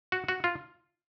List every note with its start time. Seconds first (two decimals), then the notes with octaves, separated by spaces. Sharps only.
0.12 F#4
0.28 F#4
0.44 F4